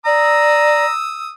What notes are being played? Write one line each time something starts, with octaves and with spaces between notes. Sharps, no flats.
D5 A#5 D#6 E6